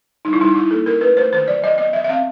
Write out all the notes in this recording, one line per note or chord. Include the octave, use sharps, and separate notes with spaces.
G3 D#4
E4
G3 D#4
D4 E4
A#3 A4
C#4 A#4
A3 B4
A3 C5
D#3 C5
F#3 D5
F#3 D#5
B3 D#5
F#3 E5
E5
C4 F5